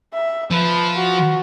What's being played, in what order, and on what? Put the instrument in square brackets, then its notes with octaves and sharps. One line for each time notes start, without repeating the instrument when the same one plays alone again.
[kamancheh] E5
[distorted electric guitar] F3 [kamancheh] B4
[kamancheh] F#4